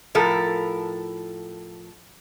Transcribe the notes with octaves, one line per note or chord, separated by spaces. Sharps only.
A2 F3 A4 A#4